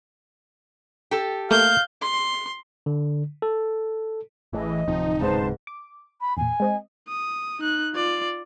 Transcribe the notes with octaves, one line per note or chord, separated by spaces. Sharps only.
G4 A4
A3 A#3 F5 G6
C6
D3
A4
A1 A2 E3 G#4 D#5
D1 C3 F3 D#4
C#2 G#2 B4 C5 A5
D6
B5
E2 A#2 G#5
G#3 C4 D#5
D#6
D#4 F#6
F4 D5